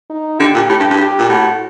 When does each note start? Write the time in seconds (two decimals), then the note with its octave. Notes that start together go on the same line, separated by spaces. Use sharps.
0.10 D#4
0.40 D3 G4
0.55 A#2
0.69 A2 G4
0.80 G2
0.90 G2
1.00 G4
1.19 A#2
1.29 A2 F#4